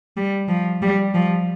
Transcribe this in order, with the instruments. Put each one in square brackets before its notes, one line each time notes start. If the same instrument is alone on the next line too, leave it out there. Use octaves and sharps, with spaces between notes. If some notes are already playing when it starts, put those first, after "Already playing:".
[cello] G3
F3
G3
F3